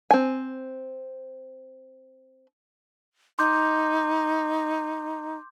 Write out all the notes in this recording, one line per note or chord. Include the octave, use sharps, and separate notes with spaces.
C4 G#5
D#4 C6 D6 G6